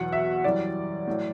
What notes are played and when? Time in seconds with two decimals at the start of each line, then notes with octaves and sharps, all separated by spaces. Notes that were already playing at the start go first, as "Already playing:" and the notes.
Already playing: E2 B2 F#3 F#5
0.12 E5
0.44 F#2 E3 G3 D5
1.07 A2 F#3